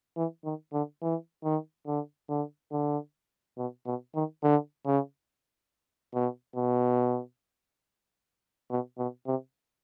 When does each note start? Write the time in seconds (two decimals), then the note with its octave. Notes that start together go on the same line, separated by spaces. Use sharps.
0.17 E3
0.44 D#3
0.73 D3
1.02 E3
1.44 D#3
1.86 D3
2.29 D3
2.72 D3
3.58 B2
3.86 B2
4.15 D#3
4.43 D3
4.86 C#3
6.14 B2
6.56 B2
8.70 B2
8.98 B2
9.27 C3